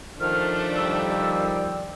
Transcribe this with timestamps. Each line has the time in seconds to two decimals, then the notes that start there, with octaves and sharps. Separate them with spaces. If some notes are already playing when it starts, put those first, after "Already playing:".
0.20 D#3 F3 A3 D4 F6
0.76 G3 E6